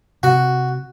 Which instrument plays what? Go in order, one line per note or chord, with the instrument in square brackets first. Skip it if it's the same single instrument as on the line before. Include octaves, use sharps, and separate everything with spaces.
[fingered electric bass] C3 [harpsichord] F#4